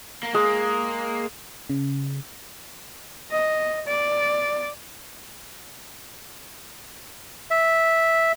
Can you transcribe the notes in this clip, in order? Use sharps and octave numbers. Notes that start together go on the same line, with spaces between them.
A#3
G#3 A#3
C#3
D#5
D5
E5